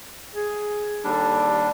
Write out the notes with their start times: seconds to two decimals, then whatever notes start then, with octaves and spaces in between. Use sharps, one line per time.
0.35 G#4
1.04 D#2 G3 D4 A4